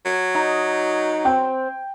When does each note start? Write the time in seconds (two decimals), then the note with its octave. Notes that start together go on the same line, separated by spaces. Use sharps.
0.05 F#3
0.35 D#4
1.25 C4 G5